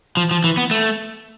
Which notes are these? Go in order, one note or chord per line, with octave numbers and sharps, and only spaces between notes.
F3
F3
E3
B3
A3